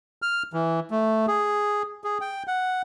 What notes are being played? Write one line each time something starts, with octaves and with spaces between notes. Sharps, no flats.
F6
E3
A3
G#4
G#4
G5
F#5